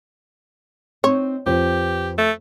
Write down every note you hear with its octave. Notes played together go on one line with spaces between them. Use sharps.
C4 D#4 C#5
F2 G4 B4 C5
A3